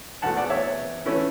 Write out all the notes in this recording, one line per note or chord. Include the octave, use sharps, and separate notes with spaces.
E2 B2 A3 F#5 A5
D5 F#5
C#5 E5
E3 A3 C#4 E4